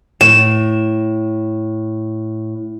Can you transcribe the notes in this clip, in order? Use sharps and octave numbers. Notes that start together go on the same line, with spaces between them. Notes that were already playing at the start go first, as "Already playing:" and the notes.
A2 E7